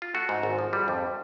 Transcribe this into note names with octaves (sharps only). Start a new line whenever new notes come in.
F4
A3 F#4
G#2
G#1
F3
G3
F2